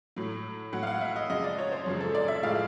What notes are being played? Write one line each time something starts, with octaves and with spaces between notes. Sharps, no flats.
A2 F#3
A2 F#3 F#5
F5
F#5
E5
D#5
F#2 C#3 F3 G#3 D#5
D5
C#5
C5
F#2 C#3 F3 G#3
A4
D5
E5
A2 F3 G#3 F5